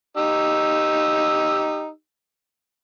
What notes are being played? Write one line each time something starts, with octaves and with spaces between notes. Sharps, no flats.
D#4 G4 E6